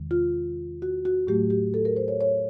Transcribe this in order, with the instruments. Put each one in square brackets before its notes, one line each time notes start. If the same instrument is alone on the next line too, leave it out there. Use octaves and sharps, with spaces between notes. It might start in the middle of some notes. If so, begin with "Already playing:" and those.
Already playing: [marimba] E2 C3 D#3 G#3
F4
F#4
F#4
A2 F#3 A3 G4
G4
A4
A#4
C5
C#5
C#5